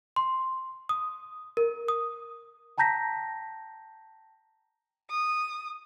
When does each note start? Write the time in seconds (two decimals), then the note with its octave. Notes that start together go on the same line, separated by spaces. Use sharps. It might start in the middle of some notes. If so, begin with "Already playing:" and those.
0.16 C6
0.89 D#6
1.57 A#4
1.88 D#6
2.78 G5 A5 A#5 G6 A#6 B6
5.10 D#6